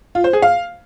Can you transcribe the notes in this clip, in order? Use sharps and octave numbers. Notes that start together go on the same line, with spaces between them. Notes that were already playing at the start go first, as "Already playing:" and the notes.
F4
C5
G#4
F5